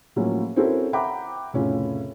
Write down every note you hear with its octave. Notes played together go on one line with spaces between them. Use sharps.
A2 F3 F#3 A#3 C#4
C4 C#4 E4 F#4 A4 A#4
E5 F#5 G5 A#5 B5 D6
F1 A2 C#3 C#4 F4